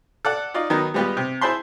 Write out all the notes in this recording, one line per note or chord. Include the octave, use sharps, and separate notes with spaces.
A4 D5 F#5
D#4 F4 D5
D#3 F#3 B3 D#4
G3 G#3 B3 F4 G4
C3
E4 G#4 C5 A5 B5 C6